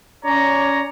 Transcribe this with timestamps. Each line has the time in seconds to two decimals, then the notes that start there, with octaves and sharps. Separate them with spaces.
0.25 C#4 C#5 D5 A#5